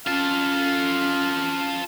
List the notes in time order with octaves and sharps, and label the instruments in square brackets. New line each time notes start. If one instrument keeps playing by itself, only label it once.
[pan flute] C#4 [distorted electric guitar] F4 A4 [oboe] F5